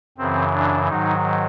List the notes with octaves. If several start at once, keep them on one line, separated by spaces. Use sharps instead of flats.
F#2 C#3 E3 C4
D4
G#2 D#3 F#3 D#4